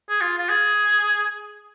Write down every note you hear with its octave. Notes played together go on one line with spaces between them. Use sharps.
G#4
F4
F4
G#4